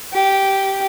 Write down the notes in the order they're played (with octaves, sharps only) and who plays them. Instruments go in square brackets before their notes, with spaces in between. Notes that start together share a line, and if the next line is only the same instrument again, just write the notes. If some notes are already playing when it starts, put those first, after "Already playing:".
[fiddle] G4